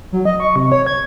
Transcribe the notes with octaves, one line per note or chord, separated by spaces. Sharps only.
F#3
D#5
C#6
C3
C#5
G#6